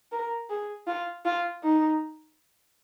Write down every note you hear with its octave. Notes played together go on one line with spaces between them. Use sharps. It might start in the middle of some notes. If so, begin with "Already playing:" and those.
A#4
G#4
F4
F4
D#4